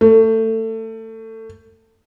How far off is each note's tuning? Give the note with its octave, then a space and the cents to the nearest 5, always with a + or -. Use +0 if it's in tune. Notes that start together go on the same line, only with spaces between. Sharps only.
A3 +25